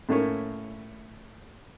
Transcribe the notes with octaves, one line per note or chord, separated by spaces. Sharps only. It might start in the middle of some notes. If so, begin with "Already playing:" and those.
A2 A3 A#3 C#4